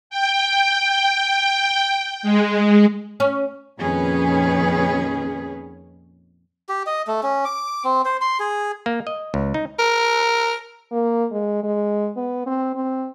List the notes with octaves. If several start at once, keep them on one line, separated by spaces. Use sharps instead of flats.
G5
G#3
C#4
F2 A#2 D#3 C#4 G#4 B4
G4
D#5
A3
C#4
D6
C4
C5
C6
G#4
A#3
D#5
C#2
D#4
A#4
A#3
G#3
G#3
B3
C4
C4